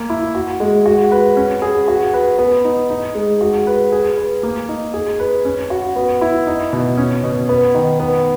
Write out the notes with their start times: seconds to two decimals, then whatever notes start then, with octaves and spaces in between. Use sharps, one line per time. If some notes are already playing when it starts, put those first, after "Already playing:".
Already playing: A#3
0.10 E4
0.35 F#4
0.60 G#3
0.86 F#4
1.12 B4
1.37 C#4
1.62 G#4
1.88 F#4
2.14 B4
2.38 B3
2.65 D#4
2.90 D#4
3.15 G#3
3.41 F#4
3.67 B4
3.92 G#4
4.18 B4
4.43 A#3
4.69 D#4
4.94 G#4
5.20 B4
5.45 C#4
5.70 F#4
5.96 B3
6.21 E4
6.47 D#4
6.73 B2
6.97 C#4
7.24 B2
7.49 B3
7.75 D#3
8.00 B3